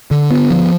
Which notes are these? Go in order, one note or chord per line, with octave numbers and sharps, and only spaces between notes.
D3
B3
F3